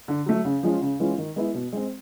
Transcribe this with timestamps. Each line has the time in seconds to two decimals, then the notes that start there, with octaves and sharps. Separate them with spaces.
0.08 D3
0.26 F#3 A3
0.45 C#3
0.63 F3 G#3 C#4 F4
0.81 C#3
0.99 E3 G#3 C#4 F4
1.18 D#3
1.36 G#3 B3 E4
1.54 B2
1.73 G#3 C4